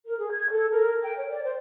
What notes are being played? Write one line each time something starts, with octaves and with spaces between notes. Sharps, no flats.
A#4
G#4
G#6
A4
A#4
G5
C#5
D5
C5